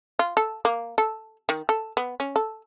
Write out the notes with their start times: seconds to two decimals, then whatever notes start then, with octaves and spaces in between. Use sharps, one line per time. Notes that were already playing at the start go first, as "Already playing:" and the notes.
0.19 F4
0.37 A4
0.65 A#3
0.98 A4
1.49 D#3
1.69 A4
1.97 B3
2.20 C#4
2.36 A4